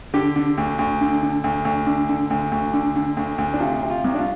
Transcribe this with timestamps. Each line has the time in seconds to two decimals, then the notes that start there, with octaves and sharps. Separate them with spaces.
0.14 D3 G4
0.36 D3
0.58 D2
0.79 D2
1.01 D3
1.22 D3
1.44 D2
1.65 D2
1.86 D3
2.09 D3
2.30 D2
2.52 D2
2.73 D3
2.96 D3
3.17 D2
3.38 D2
3.54 D4
3.60 C3 F4
3.82 C3
3.90 F4
4.04 C2
4.14 D4
4.19 F4